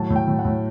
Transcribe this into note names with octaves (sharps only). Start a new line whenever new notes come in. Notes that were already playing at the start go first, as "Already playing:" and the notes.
Already playing: A2 F#3 A5
A2
G5
A2
F#5
A2